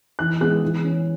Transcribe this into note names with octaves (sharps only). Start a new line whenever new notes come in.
E3 F#6
G#3 B3 F#6
E3
C#4